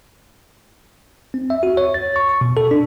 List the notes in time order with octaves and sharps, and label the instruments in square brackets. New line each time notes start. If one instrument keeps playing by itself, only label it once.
[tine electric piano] C4
E5
F#4
C#5
A6
C#6
C#6
B2
A4
D4